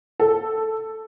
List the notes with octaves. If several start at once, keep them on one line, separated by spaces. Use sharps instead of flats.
A4